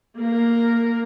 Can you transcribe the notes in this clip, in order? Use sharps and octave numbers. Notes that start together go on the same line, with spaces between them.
A#3 A#4